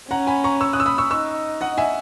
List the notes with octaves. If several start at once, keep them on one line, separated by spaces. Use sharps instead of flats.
C#4 F#5 A#5
G#5 B5
A#5 C#6
C#6 E6
D#6 F#6
E6
B5 D#6
C#6 E6
D#4 C#6 E6
D#5 F#5
E5 G#5